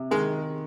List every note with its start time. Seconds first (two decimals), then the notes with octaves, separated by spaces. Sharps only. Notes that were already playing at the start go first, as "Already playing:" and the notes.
Already playing: C3
0.11 D#3 G#3